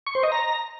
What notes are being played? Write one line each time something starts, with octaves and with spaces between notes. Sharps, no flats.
C#6
C5
D#5
A#5